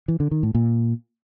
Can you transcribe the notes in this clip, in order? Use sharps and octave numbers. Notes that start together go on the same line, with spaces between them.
E3
D3
D#3
A2
A#2